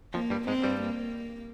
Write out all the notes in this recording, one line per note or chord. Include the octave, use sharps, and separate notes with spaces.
F2 F3 A#3
G2 G3
G#2 G#3 C4
G2 G3
A#3